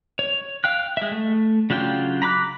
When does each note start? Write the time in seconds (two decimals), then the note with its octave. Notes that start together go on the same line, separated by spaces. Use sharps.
0.19 C#5
0.64 F5 G5 F#6
0.97 G#3 E5
1.11 A3
1.70 C#3 F#3 D4 F4 G5
2.22 A#5 B5 D6 F#6